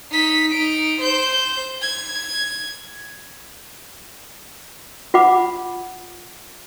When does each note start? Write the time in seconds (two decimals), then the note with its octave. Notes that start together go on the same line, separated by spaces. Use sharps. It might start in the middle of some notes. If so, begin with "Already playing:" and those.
0.12 D#4 B6
0.53 D#4 D7
1.01 C5 G6
1.82 G#6
5.14 F4 F#5 B5 D6